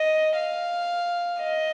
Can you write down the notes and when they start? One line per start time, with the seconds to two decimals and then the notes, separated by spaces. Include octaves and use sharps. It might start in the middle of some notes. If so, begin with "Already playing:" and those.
Already playing: D#5
0.36 F5
1.41 D#5